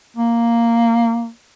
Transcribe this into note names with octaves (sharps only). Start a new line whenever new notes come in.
A#3